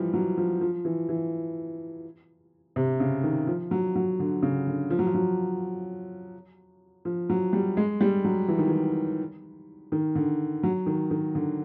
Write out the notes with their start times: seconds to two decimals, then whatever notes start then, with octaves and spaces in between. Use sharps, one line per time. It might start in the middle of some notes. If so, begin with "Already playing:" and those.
Already playing: E3 F3 G3
0.14 F#3
0.37 F3
0.61 F3
0.85 E3
1.09 E3
2.76 C3
3.00 C#3
3.23 D#3
3.47 F3
3.71 F#3
3.95 F#3
4.19 D3
4.43 C#3
4.67 D3
4.90 F3
4.99 F#3
5.06 F3
5.14 F#3
7.05 F3
7.30 F#3
7.53 G3
7.77 G#3
8.01 G3
8.24 F#3
8.48 E3
8.59 D#3
8.68 E3
9.92 D#3
10.15 D3
10.63 F#3
10.86 D#3
11.11 D#3
11.35 D3